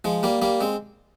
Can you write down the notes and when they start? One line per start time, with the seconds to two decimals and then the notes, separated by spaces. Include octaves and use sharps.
0.04 F3 G#3
0.23 G3 A#3
0.42 G3 A#3
0.61 G#3 C4